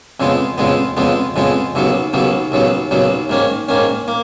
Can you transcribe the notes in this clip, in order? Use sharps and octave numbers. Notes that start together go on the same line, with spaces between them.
F2 C#3 G#3 B3
F2 C#3 G#3 B3
F2 C#3 G#3 B3
F2 C#3 G#3 B3
D#2 C#3 F#3 B3
D#2 C#3 F#3 B3
D#2 C#3 F#3 B3
D#2 C#3 F#3 B3
G#2 D#3 A#3 C#4
G#2 D#3 A#3 C#4
A#3